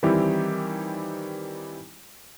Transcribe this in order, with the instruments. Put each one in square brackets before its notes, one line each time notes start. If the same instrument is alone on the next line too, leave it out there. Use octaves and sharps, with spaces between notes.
[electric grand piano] D#3 E3 G3 C4 E4 G4